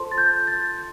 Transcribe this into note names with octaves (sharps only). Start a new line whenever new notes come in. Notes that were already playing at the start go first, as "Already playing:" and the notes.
Already playing: F4 A4 C5 A5 C6
A6
G6
A6